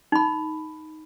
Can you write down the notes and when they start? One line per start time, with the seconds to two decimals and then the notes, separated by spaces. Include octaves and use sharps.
0.12 D#4 B5